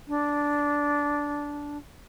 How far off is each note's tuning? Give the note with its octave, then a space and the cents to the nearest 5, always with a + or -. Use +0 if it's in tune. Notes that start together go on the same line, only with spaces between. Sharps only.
D4 -10